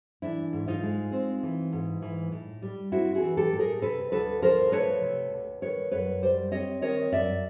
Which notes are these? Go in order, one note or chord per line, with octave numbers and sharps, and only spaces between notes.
E3 D4 E4
G#2
D#4 F4
G#3
C4
E3
G#2
E3
A2
G3
C4 E4 F#4
F#4 G#4
E3
G4 A4
A2
G#4 A#4
C3 A4 B4
D2 A4 B4
F3 A#4 C5
A3 B4 C#5
C3
D2
D#3 B4 C#5
F#2 B4 C#5
G3 C5 D5
C4 C#5 D#5
D#3 C#5 D#5
F#2 D5 E5